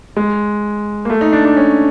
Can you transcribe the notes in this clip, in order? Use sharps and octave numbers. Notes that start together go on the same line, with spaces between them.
G#3
A#3
A3
D#4
D4
D4
C#4